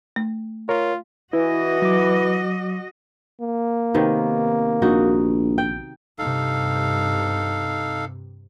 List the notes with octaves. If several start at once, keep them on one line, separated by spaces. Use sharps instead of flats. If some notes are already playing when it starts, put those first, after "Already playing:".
A3
F4 A#4 C#5
E3 E4 F#4 D#5
F#3 D6
A#3
C3 D#3 B3
A#1 D#4 F#4
G5
G2 C3 D#4 A4 F5